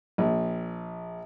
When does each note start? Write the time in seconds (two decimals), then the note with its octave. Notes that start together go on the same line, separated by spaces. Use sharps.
0.18 A#1